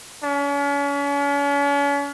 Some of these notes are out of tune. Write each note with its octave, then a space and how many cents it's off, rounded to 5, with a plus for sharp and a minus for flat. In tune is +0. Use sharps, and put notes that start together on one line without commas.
C#4 +40